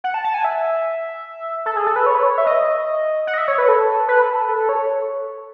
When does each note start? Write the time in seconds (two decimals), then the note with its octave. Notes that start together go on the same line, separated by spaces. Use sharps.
0.04 F#5
0.14 A5
0.24 A5
0.34 G#5
0.44 E5
1.66 A4
1.76 G#4
1.86 A4
1.96 B4
2.06 C#5
2.15 B4
2.23 C#5
2.38 E5
2.46 D#5
3.27 F#5
3.34 D#5
3.38 E5
3.48 C#5
3.58 B4
3.68 A4
4.08 B4
4.22 A4
4.36 B4
4.49 A4
4.69 C#5